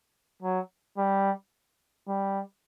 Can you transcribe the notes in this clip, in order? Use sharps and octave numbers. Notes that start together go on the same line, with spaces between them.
F#3
G3
G3